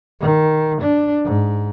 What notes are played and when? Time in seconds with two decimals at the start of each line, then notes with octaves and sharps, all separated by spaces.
0.21 D#3
0.82 D4
1.25 G#2